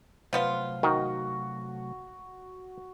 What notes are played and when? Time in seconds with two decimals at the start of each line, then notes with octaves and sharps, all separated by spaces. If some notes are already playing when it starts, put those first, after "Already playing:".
0.33 C3 F3 F#3 A3 B3 F4
0.83 D#3 F#4